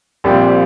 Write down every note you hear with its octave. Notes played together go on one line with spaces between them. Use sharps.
A#1 A#2 G3 C4